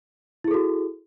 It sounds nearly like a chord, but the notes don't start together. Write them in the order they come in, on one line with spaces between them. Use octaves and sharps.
E4 G#4 A4 F#4